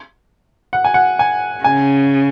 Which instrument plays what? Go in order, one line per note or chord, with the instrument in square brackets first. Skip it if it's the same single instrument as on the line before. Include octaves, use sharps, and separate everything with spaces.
[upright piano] F#5
G#5
F#5
G#5
[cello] C#3 [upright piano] G#5